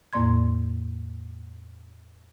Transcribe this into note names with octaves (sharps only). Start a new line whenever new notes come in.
E2 A2 A#3 D5 C6 G#6